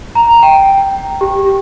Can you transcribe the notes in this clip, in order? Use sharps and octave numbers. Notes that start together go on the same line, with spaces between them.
A#5
G5
G4